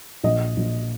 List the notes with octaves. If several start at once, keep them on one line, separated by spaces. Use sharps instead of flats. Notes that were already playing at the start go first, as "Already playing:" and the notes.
A#1 D#5
A#1